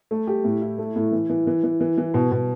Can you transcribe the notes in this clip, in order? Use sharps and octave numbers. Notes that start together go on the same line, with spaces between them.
A3
G4
A2
E4
A3
A2
E3
E3
E3
E3
E3
E3
B2
B2